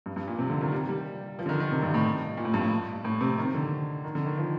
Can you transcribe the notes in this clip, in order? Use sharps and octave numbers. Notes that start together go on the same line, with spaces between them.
G2
G2
A#2
C3
D3
D#3
G3
G3
F3
D3
D#3
D#3
C3
G2
A2
A#2
A2
G2
A2
A2
C3
D#3
D3
D#3
D3
D#3
F3